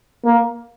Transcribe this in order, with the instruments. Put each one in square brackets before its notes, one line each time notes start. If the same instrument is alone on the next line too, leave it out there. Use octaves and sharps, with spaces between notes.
[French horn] A#3